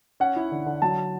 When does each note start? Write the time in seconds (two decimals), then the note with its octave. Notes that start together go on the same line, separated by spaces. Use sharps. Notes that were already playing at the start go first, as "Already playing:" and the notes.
0.20 C#4 F#5
0.36 E4
0.51 D3
0.66 D3
0.82 F#3 A5